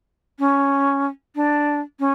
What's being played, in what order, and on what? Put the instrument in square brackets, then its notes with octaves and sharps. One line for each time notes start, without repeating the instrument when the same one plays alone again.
[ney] C#4
D4
C#4